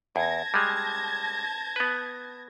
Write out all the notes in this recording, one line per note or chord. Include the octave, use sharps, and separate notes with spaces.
E2 A5 G#6 A#6
G3 G#3
B3 B4